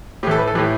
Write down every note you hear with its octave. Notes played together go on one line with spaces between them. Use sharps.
A2 E3 G4 A4
B4
A4
A2 E3 G4